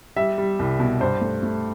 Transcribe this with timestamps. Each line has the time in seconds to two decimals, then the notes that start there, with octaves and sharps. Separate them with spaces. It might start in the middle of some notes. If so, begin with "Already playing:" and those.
0.16 G3 E5
0.38 G3
0.59 C2
0.80 B2
1.01 G2 C5
1.21 A3
1.43 A3